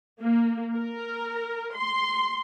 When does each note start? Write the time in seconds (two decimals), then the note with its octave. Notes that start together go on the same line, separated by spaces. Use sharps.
0.20 A#3
0.75 A#4
1.75 C6